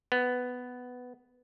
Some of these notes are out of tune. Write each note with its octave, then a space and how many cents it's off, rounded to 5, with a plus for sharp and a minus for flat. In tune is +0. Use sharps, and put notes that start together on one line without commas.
B3 +10